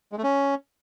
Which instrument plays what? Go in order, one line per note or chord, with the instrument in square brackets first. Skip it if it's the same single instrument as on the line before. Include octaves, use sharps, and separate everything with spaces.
[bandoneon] G#3
A3
C#4